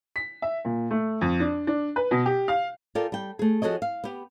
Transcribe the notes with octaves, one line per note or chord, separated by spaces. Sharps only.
B6
E5
A#2
A3
F2
D4
D4
B4
B2
G4
F5
F4 A4 A#4 D5 G5 G#5
G3 G5
A3 G#4
F3 F#4 G#4 A4 C#5 D#5
F5
B3 G4